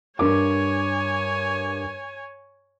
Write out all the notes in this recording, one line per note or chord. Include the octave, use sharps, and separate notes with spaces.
G2 A#4 C#5 G#5 D6